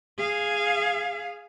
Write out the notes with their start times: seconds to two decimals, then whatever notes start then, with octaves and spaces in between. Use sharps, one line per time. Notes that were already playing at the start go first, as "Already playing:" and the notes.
0.18 G#4 F5